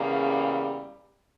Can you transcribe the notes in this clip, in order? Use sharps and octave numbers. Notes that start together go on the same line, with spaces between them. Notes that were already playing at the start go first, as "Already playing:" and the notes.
Already playing: E2 C#3 G3 A#3